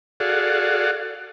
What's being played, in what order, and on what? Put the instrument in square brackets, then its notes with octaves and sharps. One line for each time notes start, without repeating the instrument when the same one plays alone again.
[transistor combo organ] F#4 G#4 A4 D5 F5 F#5